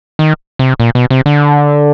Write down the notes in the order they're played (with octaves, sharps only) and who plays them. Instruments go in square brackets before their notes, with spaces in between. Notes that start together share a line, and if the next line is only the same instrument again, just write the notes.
[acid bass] D#3
C3
A#2
B2
C3
D3